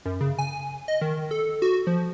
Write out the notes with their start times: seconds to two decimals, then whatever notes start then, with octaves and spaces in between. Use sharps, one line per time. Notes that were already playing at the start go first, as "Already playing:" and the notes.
0.06 F#2
0.21 C#3
0.39 G#5
0.88 D#5
1.01 D#3
1.31 A4
1.62 F#4
1.87 F3